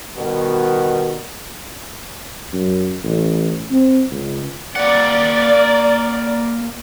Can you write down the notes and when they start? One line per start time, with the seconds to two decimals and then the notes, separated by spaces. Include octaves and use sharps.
0.17 B2 D#3 G3 B3 F#4
2.53 F#2
3.03 A1
3.71 C4
4.11 C#2
4.76 A#3 D5 F#5